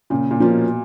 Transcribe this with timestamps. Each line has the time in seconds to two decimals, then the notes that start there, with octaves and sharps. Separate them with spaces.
0.10 A#2 C#3
0.31 A#2
0.40 F3 A#3 C#4 F4
0.50 B2